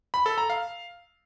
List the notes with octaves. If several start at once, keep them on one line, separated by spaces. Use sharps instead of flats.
B5
A4
A#5
F5